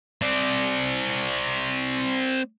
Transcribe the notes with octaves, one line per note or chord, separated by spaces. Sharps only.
C4 D5